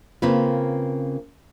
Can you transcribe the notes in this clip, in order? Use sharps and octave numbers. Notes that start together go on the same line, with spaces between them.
C#3 A#3 C4 F4 B4